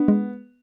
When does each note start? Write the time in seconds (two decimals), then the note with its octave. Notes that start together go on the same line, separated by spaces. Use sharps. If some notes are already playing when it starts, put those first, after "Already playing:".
Already playing: B3 D4
0.08 G#3